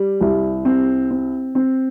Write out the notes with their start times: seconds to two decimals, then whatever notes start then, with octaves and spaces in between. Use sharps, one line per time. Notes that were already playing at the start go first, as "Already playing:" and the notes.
Already playing: G3
0.21 C2
0.65 C4
1.11 C4
1.55 C4